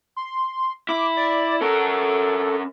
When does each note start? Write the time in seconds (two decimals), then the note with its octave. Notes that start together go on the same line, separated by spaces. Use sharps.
0.16 C6
0.89 E4 D6
1.17 D5
1.61 C#4 A4 A#4